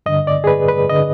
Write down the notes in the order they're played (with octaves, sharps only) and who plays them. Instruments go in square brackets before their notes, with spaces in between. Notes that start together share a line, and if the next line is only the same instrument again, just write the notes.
[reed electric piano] G2 D3 D#5
D5
G#4
B4
B4
D3 D#5